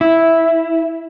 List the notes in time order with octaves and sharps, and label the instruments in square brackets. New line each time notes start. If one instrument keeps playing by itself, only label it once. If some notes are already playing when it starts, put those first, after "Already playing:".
[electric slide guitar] E4